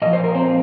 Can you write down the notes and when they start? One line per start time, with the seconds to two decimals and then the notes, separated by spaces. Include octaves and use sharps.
0.02 A#2 F3 D#5
0.13 C5
0.24 A#4
0.35 C4 C5